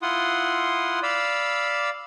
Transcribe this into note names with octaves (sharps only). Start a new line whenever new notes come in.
E4 F4 F#5 C6 D#6
D5 F5 B5 E6